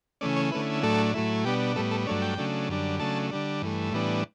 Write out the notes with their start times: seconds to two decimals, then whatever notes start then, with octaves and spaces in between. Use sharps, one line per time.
0.21 C#3 E3 A3 C#4 D5
0.36 C#5
0.52 D3 A3 C#4 E4 B4
0.83 A2 F#3 A3 D4 A4
1.14 A2 F#3 A3 E4
1.45 B2 G3 B3 D4 G4
1.76 A2 G3 B3 A4
1.91 A4
2.07 G2 F#3 A3 D4 C#5
2.22 G5
2.38 C#3 F#3 A3 D4
2.69 F#2 D3 G3 D4
3.00 C#3 F#3 A3 D4 A5
3.31 D3 G3 D4
3.62 G2 E3 A3
3.92 A2 E3 G3 B3 D4